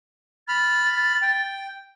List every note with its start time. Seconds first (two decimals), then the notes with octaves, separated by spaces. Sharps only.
0.48 B5 F6 A6
1.22 G5